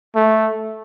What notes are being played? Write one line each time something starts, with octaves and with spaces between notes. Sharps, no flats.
A3